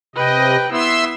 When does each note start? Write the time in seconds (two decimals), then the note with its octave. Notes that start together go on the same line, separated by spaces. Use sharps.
0.16 C3 B4 D#5 G5
0.72 B3 E4 E5 C6 E6